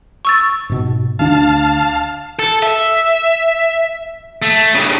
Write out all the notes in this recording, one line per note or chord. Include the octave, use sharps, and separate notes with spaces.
C#6 E6 A6
G#2 B2
D2 D3 D4 F5 A5
A4
E5
A3
G2 C#3